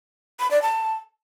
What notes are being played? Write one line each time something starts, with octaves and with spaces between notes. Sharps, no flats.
B5
D5
A5